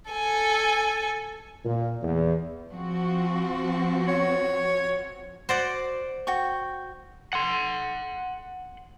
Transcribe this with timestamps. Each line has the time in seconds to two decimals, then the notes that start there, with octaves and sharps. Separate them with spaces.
0.11 A4 G#5
1.65 A#2
2.03 E2
2.70 F3 C4 F#4
4.08 C#5
5.49 F#4 C5 D5 F#5
6.27 F#4 G5 C#6
7.33 F#5 C6